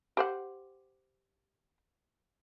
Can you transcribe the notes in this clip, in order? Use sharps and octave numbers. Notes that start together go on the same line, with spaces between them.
G4 C5 F#5